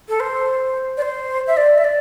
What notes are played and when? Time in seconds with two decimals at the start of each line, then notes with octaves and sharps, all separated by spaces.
0.09 A4
0.20 C5
0.97 D5
1.02 C5
1.47 E5
1.57 D5
1.78 E5
1.84 D5